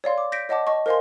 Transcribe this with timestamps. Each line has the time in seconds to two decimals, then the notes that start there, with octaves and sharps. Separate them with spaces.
0.04 C#5 D5 F5 C6
0.18 D6
0.32 G6 A#6 B6 D7
0.49 C#5 D#5 F#5 A5 D6
0.67 D#5 A5 C#6
0.86 A#4 C5 D#5 F5 G#5 C6